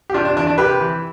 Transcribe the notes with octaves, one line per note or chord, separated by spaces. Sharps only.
G4
C3 D4 F4
D4
E3 D4
D4
C3 G4 B4
E3